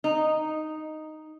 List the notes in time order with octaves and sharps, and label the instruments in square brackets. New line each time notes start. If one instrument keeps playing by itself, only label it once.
[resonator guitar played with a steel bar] D#4